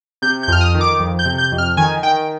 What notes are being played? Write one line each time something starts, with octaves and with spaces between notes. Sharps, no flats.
C3 G6
G6
F2 F6
D#6
D#3
D6
F2
G6
C3
G6
F2
F6
D#3 G#5
D#3 G5